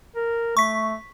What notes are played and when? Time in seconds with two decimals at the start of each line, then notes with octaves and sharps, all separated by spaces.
0.16 A#4
0.57 A3 C#6 B6